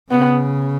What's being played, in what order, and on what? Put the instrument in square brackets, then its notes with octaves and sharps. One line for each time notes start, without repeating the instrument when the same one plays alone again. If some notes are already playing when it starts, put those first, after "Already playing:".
[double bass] C#3 [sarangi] B3